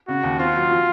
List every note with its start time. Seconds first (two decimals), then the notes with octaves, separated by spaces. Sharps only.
0.08 C#3 F#4
0.24 D#2
0.39 C4 F4
0.55 F#3
0.71 F3